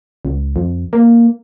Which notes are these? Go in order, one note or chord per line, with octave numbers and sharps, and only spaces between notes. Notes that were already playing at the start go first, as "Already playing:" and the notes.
C#2
F2
A#3